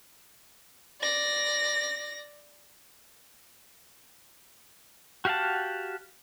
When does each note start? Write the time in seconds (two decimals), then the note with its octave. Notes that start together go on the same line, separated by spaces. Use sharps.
1.01 D5 A#6
5.25 F#4 G4 F5 F#5 A5